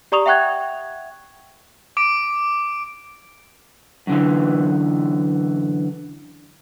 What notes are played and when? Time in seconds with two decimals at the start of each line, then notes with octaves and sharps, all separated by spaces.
0.12 G4 D5 A#5 C#6 D#6 F7
0.26 E5 F#5 G5 C#6 F#6 G#6
1.97 D6 D7
4.07 F#2 D3 E3